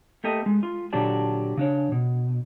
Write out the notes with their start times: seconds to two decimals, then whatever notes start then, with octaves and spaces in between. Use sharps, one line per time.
0.24 A3 A#3 G4 A4 D#5
0.46 G#3
0.63 F4
0.93 A#2 D3 F#3 G4 D5 A5
1.57 C#3 D4 C#5
1.92 B2